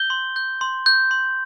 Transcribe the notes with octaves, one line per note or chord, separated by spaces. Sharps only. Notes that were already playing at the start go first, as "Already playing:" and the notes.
Already playing: G6 G7
C6
G6
C6
G6
C6